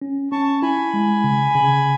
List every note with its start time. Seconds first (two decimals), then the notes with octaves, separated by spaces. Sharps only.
0.02 C#4
0.32 C#4 A5 C#6
0.62 E4 G#5 B5
0.94 G#3
1.24 C#3
1.55 C#3